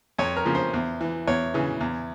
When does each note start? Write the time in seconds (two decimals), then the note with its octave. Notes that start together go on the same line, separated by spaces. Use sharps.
0.18 F2 C#5
0.36 A#4
0.45 C#3 F3
0.55 C5
0.74 E2
1.01 E3
1.27 E2 C#5
1.54 C#3 E3
1.81 E2